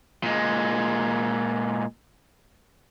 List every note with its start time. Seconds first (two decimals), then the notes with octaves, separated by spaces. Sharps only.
0.23 A#2 G#3